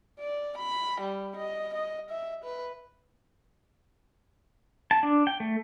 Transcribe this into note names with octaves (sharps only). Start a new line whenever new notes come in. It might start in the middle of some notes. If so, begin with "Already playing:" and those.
D5
B5
G3
D#5
D#5
E5
B4
A5
D4
G5
A3